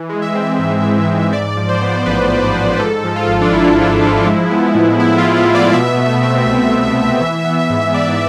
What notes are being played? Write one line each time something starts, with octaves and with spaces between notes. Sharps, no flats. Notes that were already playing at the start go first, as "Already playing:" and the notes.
Already playing: E3
G#3
E5
C4
G#2
E3
G#3
G#2 D5
F3
C5
B3
A1 B4
G#2
F3
G#2 A4
F3
F4
G#1
D4
G#1 E4
G#2
F3
G#3
B3
A2
A2 E4
F4
G#3
E4
B3
D5
B2 E5
A3
C4
C2
B2
A3
E3
B3
G#2
G#2 D5